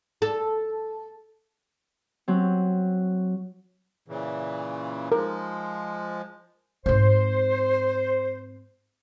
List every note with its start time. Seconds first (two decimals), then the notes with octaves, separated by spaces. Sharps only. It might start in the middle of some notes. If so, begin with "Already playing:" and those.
0.22 A4
2.28 F#3 C4
4.08 A#2 C#3 E3
5.12 F3 G#3 A#4
6.86 G#2 C4 C5